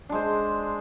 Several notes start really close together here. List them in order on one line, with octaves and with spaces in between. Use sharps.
D4 G#3 C5